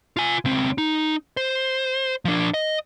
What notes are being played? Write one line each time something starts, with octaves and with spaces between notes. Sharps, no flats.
F4 G#5
C#2 C4
D#4
C5
F3 D4
D#5